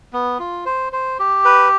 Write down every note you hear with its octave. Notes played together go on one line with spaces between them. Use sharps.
B3
F4
C5
C5
G4
B4